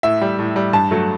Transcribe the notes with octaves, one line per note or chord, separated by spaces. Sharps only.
A2 E5
G3
A2
G3
G2 A5
F#3 A3